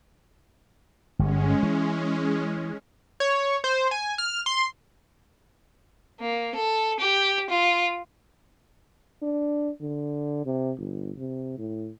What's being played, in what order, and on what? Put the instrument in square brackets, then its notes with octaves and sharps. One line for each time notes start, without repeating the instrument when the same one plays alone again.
[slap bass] G1 [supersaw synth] G#3 C#4
[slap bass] E3
[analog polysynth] C#5
C5
G#5
F6
C6
[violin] A#3
A4
G4
F4
[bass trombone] D4
D3
C3
G1
C3
A2